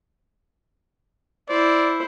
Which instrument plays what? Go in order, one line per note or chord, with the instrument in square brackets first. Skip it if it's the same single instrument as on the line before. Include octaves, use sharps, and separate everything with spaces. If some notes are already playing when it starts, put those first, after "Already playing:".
[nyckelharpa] E4 C5 [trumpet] D5